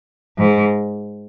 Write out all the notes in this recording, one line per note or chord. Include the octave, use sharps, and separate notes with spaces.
G#2